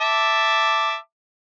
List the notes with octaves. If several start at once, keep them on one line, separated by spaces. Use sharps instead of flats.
E5 A5 D6